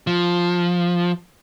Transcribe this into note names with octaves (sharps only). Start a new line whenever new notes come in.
F3